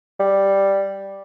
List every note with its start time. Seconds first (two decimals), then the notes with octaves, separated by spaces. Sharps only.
0.20 G3